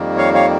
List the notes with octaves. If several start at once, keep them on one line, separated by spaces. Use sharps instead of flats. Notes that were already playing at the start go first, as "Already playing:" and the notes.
Already playing: F2 D#3 G3 A#3
C#5 F5
C#5 F5